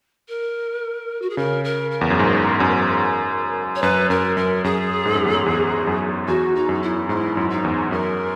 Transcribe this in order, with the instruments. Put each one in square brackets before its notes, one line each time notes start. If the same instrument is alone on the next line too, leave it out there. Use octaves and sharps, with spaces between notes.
[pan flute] A#4
F#4
G#4
[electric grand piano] C#3 [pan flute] A#4
[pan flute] A#4
A#4
[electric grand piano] E2
F#2
G#2
F#2
[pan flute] C#5
[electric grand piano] F#2 [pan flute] B4
[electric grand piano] F#2 [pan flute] A#4
[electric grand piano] F#2 [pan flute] A#4
[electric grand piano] F#2 [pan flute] G#4
[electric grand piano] G#2
F#2
E2
F#2
E2
F#2
[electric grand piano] E2 [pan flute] F#4
[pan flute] D#4
[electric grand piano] F#2
[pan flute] E4
[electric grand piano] G#2 [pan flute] E4
[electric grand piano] F#2
[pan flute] D#4
[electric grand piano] E2
[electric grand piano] F#2 [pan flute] A#4